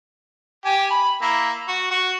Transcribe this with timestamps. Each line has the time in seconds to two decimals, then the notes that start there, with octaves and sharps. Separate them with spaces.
0.65 G4 G#5
0.90 B5
1.22 A#3 E4
1.68 F#4
1.91 F#4